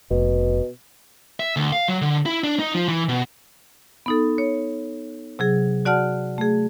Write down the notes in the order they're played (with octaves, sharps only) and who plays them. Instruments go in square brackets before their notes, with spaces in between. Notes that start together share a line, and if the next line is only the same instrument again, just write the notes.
[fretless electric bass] F1 [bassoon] B2
[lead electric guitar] E5
D2
F5
F#3
D3
E4
D4
D#4
F3
E3
B2
[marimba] B3 D#4 A4
C#5
C3 F#3 G#4
F#4 D5 F#5 A5 F6
A3 G#4